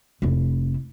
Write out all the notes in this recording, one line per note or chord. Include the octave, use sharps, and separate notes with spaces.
F1 E4